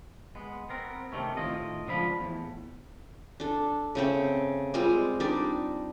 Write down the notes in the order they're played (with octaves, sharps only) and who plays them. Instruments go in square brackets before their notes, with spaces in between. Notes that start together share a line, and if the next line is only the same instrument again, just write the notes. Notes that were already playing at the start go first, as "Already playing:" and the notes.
[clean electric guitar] G#3 B3
B3 C4 A#4
C3 D#3 A3 C#4
A2 D#3 F4 D#5
C#2 D3 F3 E5 B5
E2 A2
[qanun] D4 A4
C#3 A3 C4
G3 G#3 C4 F4
G3 D4 D#4 D5